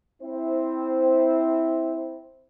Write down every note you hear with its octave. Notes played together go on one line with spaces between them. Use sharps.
C4 E4 C5